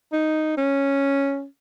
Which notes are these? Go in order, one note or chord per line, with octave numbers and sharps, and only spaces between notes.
D#4
C#4